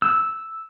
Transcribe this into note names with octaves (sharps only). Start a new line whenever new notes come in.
E6